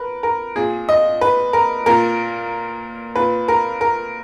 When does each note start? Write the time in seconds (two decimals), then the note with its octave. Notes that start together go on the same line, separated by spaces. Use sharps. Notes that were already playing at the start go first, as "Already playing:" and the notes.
Already playing: A#4 B4
0.23 A#4
0.56 A#2 G#4
0.89 D#5
1.21 B4
1.53 A#4
1.86 A#2 A#4
3.16 A#2 B4
3.48 A#4
3.81 A#4